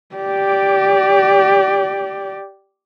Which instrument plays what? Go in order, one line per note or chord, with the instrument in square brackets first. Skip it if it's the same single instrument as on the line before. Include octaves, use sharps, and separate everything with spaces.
[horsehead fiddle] G4 D5